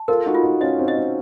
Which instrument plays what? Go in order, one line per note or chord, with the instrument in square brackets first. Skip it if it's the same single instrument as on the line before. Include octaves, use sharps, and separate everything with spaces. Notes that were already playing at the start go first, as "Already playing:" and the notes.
Already playing: [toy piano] A5
[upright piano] F4 A4 [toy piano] A#4
[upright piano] D#4 F#4
[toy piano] F4
[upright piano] D#4 F#4
[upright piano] C#4 F4 [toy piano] D#5
[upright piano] C4 D#4
[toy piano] D#5
[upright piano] C#4